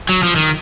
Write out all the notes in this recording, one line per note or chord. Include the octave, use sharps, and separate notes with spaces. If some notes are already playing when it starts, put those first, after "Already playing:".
F#3
F3
D#3